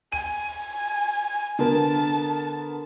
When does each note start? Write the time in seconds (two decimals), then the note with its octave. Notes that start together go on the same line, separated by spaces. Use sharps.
0.12 G#5 D#7
1.59 D3 B3 A#4 A5